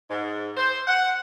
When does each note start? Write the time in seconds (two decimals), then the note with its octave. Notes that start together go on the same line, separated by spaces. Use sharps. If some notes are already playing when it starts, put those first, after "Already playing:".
0.11 G#2
0.57 C5
0.87 F#5